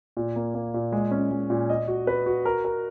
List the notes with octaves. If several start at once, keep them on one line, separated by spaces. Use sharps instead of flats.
A#2
A#3
A#3
A#2
G#3
C#4
G#3
A#2
D#5
F#4
B4
F#4
A#4
A#4